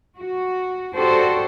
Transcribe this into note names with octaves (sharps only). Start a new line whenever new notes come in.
F#4
D4 F#4 G4 A4 C5